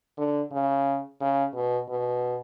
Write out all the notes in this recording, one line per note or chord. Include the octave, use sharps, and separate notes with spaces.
D3
C#3
C#3
B2
B2